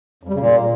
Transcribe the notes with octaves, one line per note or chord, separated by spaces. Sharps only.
F2
G3
C#3
A#2